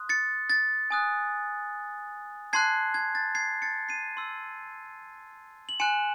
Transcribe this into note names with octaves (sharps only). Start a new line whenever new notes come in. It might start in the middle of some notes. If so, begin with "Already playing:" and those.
Already playing: C6 D#6 F#6
A6 C#7
A6
G#5 D#6 F#6
A5 C6 F#6 G#6 C7
G#6
A6
G#6 C7
A6 C#7
C7 D#7
C6 E6
F#7
G#5 C6 F#6 C#7 E7